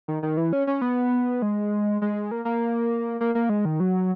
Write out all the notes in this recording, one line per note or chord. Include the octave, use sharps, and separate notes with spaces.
D#3
D#3
E3
C#4
C#4
B3
G#3
G#3
A#3
A#3
A#3
A#3
G#3
D#3
F#3